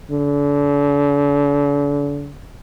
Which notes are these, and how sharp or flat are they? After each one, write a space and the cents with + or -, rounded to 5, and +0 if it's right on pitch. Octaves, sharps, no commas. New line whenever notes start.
D3 -40